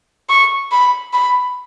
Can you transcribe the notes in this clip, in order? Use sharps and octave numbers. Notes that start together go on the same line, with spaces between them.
C#6
B5
B5